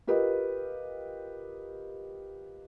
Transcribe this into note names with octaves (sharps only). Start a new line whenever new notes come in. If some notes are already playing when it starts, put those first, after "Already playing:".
F4 G4 A#4 B4 D#5